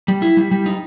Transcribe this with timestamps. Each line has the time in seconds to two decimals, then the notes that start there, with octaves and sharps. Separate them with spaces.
0.08 G3
0.22 E4
0.37 G3
0.51 G3
0.66 D#4